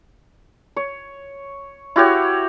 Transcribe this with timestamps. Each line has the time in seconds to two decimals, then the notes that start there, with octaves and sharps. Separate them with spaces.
0.76 C#5
1.96 E4 F#4 G4 C#5